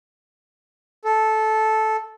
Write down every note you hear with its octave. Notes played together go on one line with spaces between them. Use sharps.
A4